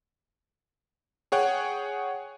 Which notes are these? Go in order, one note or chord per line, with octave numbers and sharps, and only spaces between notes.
G#4 C#5 F#5 G5